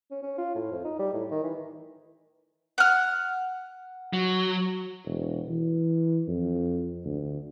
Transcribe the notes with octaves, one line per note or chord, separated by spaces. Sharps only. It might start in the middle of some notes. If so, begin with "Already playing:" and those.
C#4
C#4
F4
A2
F2
D#4
G3
A2
D#3
E3
F#5 F6
F#3
E1
E3
F2
D2